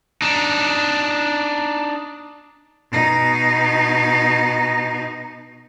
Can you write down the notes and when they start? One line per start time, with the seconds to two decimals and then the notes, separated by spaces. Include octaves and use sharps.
0.22 D4 D#4
2.91 B2 D#4